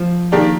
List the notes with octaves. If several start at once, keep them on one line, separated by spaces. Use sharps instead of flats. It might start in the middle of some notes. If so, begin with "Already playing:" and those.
Already playing: F3
D#3 A#3 D4 G4